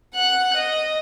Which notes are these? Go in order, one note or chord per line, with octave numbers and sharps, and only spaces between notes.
F#5 F#6
D#5